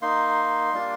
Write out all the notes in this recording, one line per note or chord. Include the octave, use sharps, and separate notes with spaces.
A#3 D#4 C6
G3 A#3 D4 F4